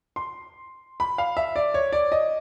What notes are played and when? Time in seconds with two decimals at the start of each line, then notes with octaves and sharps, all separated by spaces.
0.16 C6
1.00 B5
1.18 F5
1.37 E5
1.56 D5
1.74 C#5
1.93 D5
2.12 D#5